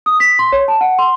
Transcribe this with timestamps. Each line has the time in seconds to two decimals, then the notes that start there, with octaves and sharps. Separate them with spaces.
0.06 D#6
0.20 B6
0.39 C6
0.52 C#5
0.68 A5
0.81 F#5
0.99 C6